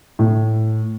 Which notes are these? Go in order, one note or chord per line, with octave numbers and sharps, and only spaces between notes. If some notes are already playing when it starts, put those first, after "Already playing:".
A2